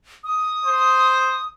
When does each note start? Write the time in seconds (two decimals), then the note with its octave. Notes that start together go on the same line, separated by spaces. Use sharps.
0.24 D#6
0.65 C5